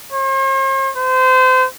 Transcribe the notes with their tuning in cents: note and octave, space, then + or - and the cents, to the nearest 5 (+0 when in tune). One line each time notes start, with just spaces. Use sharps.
C5 +45
C5 -30